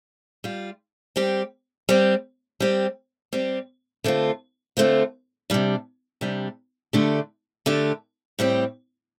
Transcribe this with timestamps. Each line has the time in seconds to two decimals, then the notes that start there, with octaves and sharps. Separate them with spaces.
0.44 G3 F4
1.16 G3 C4 G4
1.89 G3 C4 G4
2.60 G3 C4 G4
3.33 G3 C4 G4
4.04 D3 A3 C4 F4
4.77 D3 A3 C4 F4
5.50 C3 G3 D4
6.21 C3 G3 D4
6.93 D3 A3 D4 G4
7.66 D3 A3 D4 G4
8.39 A2 G3 C4 G4